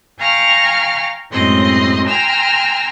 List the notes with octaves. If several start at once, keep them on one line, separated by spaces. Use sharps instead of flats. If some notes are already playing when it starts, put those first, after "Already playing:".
F5 G5 G#5 A#5 C#6 F6
F#2 A2 G#3 C4 D#5 C6
G5 G#5 A#5 C6 E6 F6